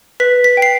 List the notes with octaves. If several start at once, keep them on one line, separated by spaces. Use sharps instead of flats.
B4 B6
B6
G5
C7